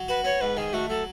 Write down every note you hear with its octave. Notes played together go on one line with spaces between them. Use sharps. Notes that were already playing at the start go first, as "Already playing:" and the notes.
Already playing: F#3
F#4 B4
B3 C#5
G#2 B4
D#3 G#4
A3 F#4
F#3 A4